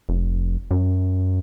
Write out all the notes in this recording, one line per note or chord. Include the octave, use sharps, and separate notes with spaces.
F1
F#2